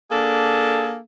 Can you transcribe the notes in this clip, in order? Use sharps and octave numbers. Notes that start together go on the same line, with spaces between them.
A#3 D4 G#4 A4